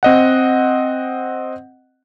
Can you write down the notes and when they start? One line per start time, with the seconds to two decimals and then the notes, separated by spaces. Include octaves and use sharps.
0.03 C4 D#5 F#5